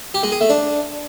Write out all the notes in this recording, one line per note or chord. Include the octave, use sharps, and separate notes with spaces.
G4
G#3
G#4
A3
D4